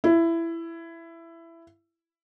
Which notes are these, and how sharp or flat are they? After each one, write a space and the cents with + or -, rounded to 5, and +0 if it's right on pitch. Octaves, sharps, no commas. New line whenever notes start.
E4 +15